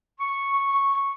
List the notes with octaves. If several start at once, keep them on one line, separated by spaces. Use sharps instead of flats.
C#6